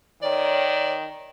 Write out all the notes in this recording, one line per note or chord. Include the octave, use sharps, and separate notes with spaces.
D#3 C#5 D5